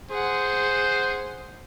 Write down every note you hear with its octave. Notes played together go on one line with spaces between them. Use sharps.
G#4 C5 F#5